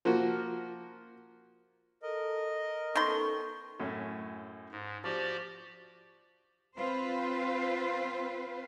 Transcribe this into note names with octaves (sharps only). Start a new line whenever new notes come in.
F3 A#3 F#4
A4 A#4 D#5
D#3 B3 C#4 A4 C6 C#6
F#2 A2 C#4
G#2
F3 F#4 G4 D5
C4 F4 B4 C5